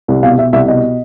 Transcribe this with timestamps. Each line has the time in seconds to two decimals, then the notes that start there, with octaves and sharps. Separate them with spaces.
0.08 C2
0.23 B2 F5
0.38 B2 E5
0.53 C2 E5
0.68 B2 D#5